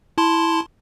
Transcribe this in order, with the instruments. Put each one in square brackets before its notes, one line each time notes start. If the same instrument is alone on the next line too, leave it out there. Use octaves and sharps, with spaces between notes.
[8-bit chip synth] E4 A5 C6